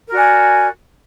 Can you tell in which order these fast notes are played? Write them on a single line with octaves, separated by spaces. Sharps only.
A#4 F#4 D5 G#5